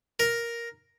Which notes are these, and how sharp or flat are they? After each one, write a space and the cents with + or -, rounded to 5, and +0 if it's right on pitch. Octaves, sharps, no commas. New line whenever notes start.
A#4 +5